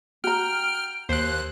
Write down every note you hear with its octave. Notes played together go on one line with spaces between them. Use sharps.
F#4 G5 A#5 F6
D#2 C5 F#6